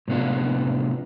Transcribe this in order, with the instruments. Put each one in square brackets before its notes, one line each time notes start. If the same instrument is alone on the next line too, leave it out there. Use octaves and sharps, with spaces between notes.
[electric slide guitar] A2 C3 B3 D4 F4